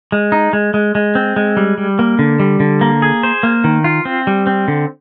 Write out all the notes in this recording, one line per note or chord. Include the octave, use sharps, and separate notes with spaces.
G#3
D#4
G#3
G#3
G#3
C4
G#3
G3
G3
A#3
D3
G3
D3
A#3
G#4
C5
A#3
D#3
F4
C4
G3
C4
D3